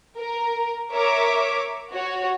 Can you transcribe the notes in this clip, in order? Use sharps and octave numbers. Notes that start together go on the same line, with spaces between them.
A#4
A#4 C#5 E5 D6
F#4 C#5